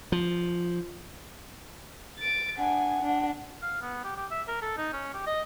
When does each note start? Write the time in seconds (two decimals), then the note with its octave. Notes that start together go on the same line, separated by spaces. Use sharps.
0.12 F3
2.19 A6 D7
2.58 D4 F#5 G#5
3.02 D4
3.63 F5
3.82 B3
4.04 G4
4.17 G4
4.31 E5
4.48 A#4
4.62 A4
4.78 D#4
4.93 C#4
5.14 G4
5.26 D#5